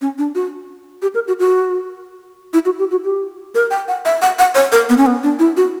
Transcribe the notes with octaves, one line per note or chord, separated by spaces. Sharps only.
C#4
D4
F#4
G4
A#4
F#4
F#4
E4
F#4
G4
F#4
G4
A#4
G5
F#5
E5
F#5
F#5
C#5
A#4
B3
C#4
B3
D4
E4
F#4